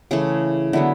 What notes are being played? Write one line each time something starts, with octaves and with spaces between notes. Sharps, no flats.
C#3 E3 A3 G#4
D3 F#3 B3 E4